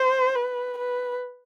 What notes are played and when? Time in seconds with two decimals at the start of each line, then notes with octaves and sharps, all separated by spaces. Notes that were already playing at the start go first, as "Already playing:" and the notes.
Already playing: C5
0.35 B4
0.78 B4